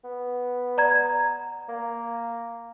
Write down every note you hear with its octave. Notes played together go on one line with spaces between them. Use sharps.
B3
D5 A#5 G#6
A#3